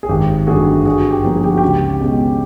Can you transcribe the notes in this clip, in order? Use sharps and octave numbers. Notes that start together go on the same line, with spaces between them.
G#4
G#1 G4
G2 D3 F#3 A3 F#4 G#4
G2 F#4 G#4
G4
D3 F3 A#3
G#4
G4
F#4
C#2 G4
B2 G#3 C#4